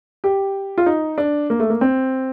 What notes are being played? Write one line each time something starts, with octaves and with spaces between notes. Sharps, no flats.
G4
F4
D#4
D4
A#3
A3
A#3
C4